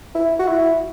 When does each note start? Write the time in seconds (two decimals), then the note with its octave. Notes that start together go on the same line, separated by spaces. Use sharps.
0.15 E4
0.39 F#4
0.48 E4